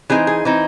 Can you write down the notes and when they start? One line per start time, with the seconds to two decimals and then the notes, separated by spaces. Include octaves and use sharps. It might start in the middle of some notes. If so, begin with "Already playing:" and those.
0.10 E3 C4 D#4 G#4
0.27 G#4
0.45 E3 C4 D#4